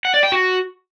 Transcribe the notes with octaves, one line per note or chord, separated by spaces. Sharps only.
F#5
D5
G5
F#4